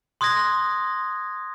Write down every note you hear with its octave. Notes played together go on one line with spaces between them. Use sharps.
C6 D#6 F#6 G#6 A#6